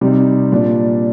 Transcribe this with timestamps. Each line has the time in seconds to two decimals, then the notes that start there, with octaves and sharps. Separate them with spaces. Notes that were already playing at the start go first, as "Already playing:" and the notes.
0.01 C3 G3 C4 D#4
0.52 A#2 G3 D4